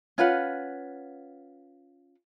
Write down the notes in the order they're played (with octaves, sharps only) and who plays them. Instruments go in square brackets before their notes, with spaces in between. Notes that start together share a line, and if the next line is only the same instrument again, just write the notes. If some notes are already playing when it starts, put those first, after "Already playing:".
[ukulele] C#4 F4 B4 F#5